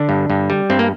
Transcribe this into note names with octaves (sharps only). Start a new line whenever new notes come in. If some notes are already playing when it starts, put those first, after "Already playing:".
Already playing: D3 D4
G2
G2
G3
G2 C4
A#3